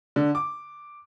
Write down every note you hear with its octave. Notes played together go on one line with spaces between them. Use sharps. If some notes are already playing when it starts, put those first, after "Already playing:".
D3
D6